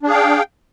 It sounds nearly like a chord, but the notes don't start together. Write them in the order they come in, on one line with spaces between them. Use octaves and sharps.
D4 G#4 F5 G5